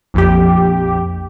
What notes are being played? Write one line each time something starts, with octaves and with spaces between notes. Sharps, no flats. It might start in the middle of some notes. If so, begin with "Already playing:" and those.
A#1 F2 G4